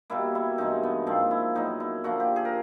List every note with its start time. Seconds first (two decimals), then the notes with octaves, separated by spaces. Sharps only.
0.10 B2 G3 A#3 E4
0.35 E4
0.58 G2 E3 G#3 D#4
0.83 B3
1.07 G#2 F3 A#3 C4
1.31 E4
1.55 A#2 F#3 B3 D#4
1.80 E4
2.04 D3 F3 A#3 F#4
2.20 G4
2.36 G#4
2.45 A#4